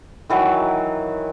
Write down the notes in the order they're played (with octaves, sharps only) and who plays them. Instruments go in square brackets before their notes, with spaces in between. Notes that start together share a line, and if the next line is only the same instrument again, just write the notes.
[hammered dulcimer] D#3 E3 F#3